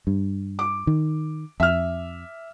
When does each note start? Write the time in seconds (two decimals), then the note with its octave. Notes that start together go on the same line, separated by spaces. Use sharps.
0.07 G2
0.59 D6
0.87 D#3
1.60 F2 E5 F6